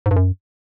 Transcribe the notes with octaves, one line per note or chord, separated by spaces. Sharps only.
G#2
G2
F#2